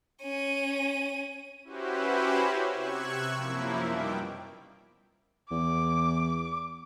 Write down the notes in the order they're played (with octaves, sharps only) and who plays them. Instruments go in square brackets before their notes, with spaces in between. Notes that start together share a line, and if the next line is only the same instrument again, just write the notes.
[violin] C#4 D#7
[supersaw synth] C#4 E4 F#4 G4 B4 C5
C3 C#6 E6 F#6 G#6
F#2 F3 A#3 E4
B2 D#3 G3 G5 D6
[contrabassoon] E2 [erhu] D6